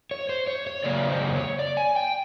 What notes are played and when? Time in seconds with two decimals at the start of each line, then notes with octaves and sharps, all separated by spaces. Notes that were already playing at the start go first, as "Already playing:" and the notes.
0.11 C#5
0.29 C5
0.47 C#5
0.67 C#5
0.84 C#3 F#3 A#3 D5
1.09 C5
1.35 C#5
1.59 D5
1.77 G#5
1.96 G5